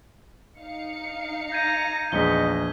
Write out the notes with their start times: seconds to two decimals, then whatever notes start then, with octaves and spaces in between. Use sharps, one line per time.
0.58 D#4 F5 C#7
1.52 A#5 G6 G#6 D#7
2.12 A#1 E2 G#3 D#5 B6 G7